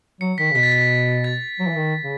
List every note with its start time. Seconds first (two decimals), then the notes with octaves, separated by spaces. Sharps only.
0.21 F#3 C#7
0.38 D#3 B6
0.51 C#3
0.55 B2 B6
0.63 A6
0.72 B6
1.24 A6
1.59 F#3
1.68 E3
1.76 D#3
2.02 C#3